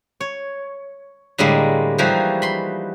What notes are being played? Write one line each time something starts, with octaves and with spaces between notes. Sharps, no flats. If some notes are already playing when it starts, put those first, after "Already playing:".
C#5
A2 D3 G3 G#3 A#3
E3 F3 G3 D#4 F#4 G#4
B5 C6